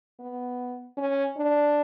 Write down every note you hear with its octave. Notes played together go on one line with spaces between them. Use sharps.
B3
C#4
D4